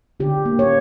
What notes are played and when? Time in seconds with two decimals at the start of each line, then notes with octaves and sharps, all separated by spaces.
0.20 D3 G4
0.45 A#3
0.59 C#5